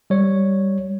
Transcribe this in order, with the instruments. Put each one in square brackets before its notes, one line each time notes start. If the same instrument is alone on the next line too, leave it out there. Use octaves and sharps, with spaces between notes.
[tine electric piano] G3 C#5